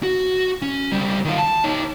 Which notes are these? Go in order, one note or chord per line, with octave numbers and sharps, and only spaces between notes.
F#4
C#4
C#2 G3
D#3 F4
A5
D#4 C#5